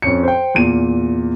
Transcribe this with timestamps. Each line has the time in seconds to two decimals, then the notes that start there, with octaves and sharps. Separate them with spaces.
0.02 F2 C#4 C#7
0.23 C5 G5
0.55 E2 A#2 D#7